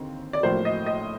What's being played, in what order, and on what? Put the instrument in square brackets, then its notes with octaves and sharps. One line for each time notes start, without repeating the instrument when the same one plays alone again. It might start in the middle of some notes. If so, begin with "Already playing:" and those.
Already playing: [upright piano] D#2 D3 C4
D5
A#1 A2 F#3 A#3 C5
D#5
D#5